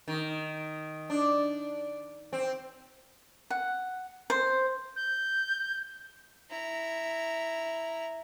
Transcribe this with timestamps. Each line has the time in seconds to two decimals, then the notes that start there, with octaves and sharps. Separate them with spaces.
0.08 D#3
1.10 D4
2.33 C4
3.50 F#5
4.30 C5
4.96 G6
6.51 E4 A#5